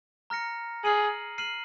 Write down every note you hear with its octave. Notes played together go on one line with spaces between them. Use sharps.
A#5 F6 A#6 C#7
G#4 F6 C7 D#7 F#7
F6 C7 D#7 F#7